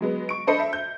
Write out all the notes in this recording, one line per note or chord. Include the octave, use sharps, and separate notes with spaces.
F#3 G#3 B3
C#6 D7
D4 A4 C5 D#5 B5 C#7
E5
G6